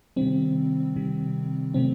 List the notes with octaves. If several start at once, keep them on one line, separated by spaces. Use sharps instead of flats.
C3 D#3 G3 C4
C3 D#3 G3
C3 F#3 A3 C4